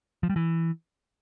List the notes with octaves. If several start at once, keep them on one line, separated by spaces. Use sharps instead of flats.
F3
G3
E3